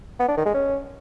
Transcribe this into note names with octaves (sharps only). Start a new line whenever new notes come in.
B3
D4
D#3
G#3
C#4